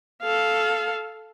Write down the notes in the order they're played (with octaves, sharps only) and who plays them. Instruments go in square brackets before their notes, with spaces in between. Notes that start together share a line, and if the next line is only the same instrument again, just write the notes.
[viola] A4 F5